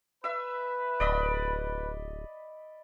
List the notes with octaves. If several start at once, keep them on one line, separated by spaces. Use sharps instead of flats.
B4 E5 E6
D1 D5 D#5 B5